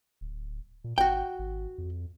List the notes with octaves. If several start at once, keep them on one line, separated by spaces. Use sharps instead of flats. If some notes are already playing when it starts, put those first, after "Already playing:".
D1
A#2
G#1 F#4 G5
G#1
F2